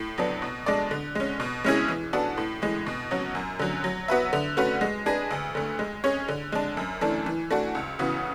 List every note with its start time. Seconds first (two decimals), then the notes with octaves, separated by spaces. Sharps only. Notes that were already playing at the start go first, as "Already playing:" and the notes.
Already playing: A2
0.18 F#3 B3 D4
0.42 B2
0.66 G#3 D4 A4 D5
0.91 D3
1.15 G#3 C#4
1.40 B2
1.64 G#3 C#4 E4 G#4
1.88 E3
2.13 B3 D4 F#4 A4
2.38 A2
2.62 E3 G#3
2.87 B2
3.11 F#3 C#4 F#4
3.35 F#2
3.59 D3 F#3
3.84 F#3
4.08 B3 F#4 B4 E5
4.33 D3
4.57 A3 C#4 F#4 B4
4.81 G#3
5.06 D4 G#4 B4
5.31 D2
5.55 D3 A3
5.79 G#3
6.04 C#4 G#4 C#5
6.28 D3
6.52 G#3 D4
6.77 F#2
7.01 E3 A3 D4
7.26 E3
7.51 A3 D4 F#4
7.75 C#2
7.99 C#3 E3 B3 F#4